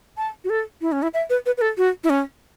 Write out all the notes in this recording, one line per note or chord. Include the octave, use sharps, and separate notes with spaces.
A5
F#4
A4
E4
C#4
E4
E5
B4
B4
B4
A4
F#4
E4
C#4